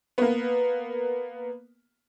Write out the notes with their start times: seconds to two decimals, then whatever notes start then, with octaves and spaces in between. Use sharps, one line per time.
0.18 A#3 B3